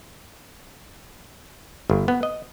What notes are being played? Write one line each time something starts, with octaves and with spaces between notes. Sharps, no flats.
G1
B3
D#5